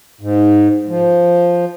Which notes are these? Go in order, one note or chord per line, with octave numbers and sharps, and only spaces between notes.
G#2
F3